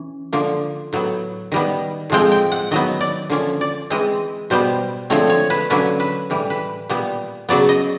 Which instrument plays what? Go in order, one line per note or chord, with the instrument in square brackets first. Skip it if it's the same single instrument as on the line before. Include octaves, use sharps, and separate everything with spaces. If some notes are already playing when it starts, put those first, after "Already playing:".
Already playing: [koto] E3 C#4
D3 F3 A#3
A2 F#3 B3
D#3 G3 B3
A2 F3 G#3 C4 G5
G5
F#5
D#3 F#3 B3 D#5
D5
D3 F3 A#3 C#4
D5
E3 G#3 C4 D#5
B2 G3 B3 C5
D3 F3 A3 C4 C#5
C#5
B4
D3 F#3 A#3 C#4 B4
B4
A2 E3 G3
B4
A#2 G3 B3
C#3 F#3 B3 D5
D#5